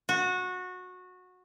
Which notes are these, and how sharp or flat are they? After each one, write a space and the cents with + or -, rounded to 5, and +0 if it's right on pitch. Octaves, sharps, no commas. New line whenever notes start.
F#4 -20